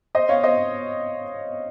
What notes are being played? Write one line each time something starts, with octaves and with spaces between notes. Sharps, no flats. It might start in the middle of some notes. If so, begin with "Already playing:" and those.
C5 D#5
C#5 F5
C5 D#5